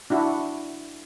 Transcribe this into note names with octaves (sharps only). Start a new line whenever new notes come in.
D4 E4 F#4